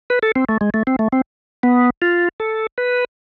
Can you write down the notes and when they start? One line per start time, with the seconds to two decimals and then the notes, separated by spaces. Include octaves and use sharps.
0.10 B4
0.23 A4
0.36 C4
0.49 A3
0.61 G#3
0.74 A3
0.87 C4
0.99 A3
1.12 C4
1.63 B3
2.02 F4
2.40 A4
2.78 B4